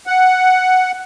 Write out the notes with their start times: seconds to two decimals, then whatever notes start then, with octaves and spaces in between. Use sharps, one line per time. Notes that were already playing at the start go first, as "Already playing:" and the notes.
0.07 F#5